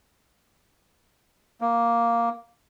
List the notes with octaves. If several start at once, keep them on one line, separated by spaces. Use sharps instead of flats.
A#3